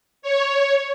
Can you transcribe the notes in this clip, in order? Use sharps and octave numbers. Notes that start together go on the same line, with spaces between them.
C#5